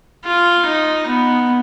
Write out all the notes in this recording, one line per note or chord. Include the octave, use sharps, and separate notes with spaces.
F4
D#4
B3